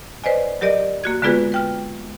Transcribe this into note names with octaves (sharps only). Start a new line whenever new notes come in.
B4 C5 D5 D#5 G#5
F#3 G4 A#4 D5 D#5
A#3 F#4 G#6
D3 G#3 B3 F4 G#4 B4
B4 G5 F6